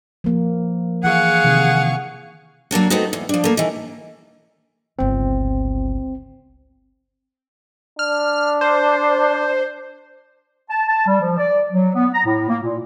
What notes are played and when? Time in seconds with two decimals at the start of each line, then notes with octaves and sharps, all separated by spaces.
0.24 F3 A#3
1.04 E3 G#4 F5 F#5 C#6
1.44 C3 D#3
2.71 F#3 A#3 D4 F#4
2.90 A3 B3 C4 D#4 F#4
3.13 E2
3.29 F3 D4
3.44 A3 A#3
3.57 D#3 E3
4.99 G1 C#2 C4
7.99 D4 F6
8.61 C5
10.70 A5
10.88 A5
11.07 G3
11.21 F3
11.38 D5
11.72 F#3
11.95 B3
12.14 A#5
12.26 A2
12.49 A#3
12.62 A#2